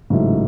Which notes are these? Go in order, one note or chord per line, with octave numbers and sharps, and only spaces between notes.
A1 G#2 C#3 F#3 A3 E4